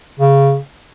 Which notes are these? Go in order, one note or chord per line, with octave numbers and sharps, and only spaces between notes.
C#3